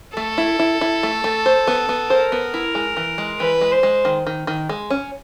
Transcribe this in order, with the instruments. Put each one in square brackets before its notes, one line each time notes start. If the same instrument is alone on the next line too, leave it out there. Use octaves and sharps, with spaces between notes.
[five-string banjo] A3 [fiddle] A4
[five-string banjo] E4
E4
E4
A3
A3
C5
B3
B3
[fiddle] A#4 [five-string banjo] C5
[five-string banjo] B3
E4
G#3
E3
G#3
[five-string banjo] E3 [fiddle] B4
[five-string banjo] G#3
[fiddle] C5
[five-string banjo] G#3
D#3
D#3
D#3
G#3
C#4